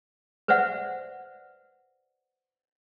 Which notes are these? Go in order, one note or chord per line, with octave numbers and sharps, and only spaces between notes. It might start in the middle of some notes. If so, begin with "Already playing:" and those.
B4 C5 D5 E5 F#5